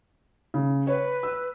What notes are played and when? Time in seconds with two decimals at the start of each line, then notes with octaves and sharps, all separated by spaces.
0.54 C#3
0.87 B4 C#5
1.23 E6